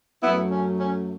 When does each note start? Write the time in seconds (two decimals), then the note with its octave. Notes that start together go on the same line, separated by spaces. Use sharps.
0.22 F#2 F#3 A3 B3 E4
0.51 C#4
0.78 C#4